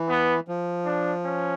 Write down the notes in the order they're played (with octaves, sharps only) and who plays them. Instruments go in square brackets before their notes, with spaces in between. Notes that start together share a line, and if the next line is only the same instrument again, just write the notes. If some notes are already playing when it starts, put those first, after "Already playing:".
Already playing: [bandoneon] E3
[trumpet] B3
[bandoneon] F3
[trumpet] D4
C#4